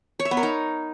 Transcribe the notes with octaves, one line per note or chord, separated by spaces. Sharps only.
C#5
E5
B3
A#4
D#4